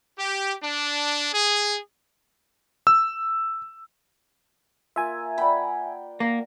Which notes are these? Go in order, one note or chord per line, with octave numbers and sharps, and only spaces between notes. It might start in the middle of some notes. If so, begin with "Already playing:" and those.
G4
D4
G#4
E6
A#3 F4 E5 G#5
D5 F#5 G5 B5
A#3